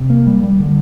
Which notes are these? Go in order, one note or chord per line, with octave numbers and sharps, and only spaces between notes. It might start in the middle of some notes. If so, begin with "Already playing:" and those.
Already playing: C3
A#3
G3
G3
D3